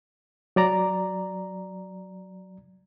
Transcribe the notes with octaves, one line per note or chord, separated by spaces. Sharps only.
F#3 D5 A#5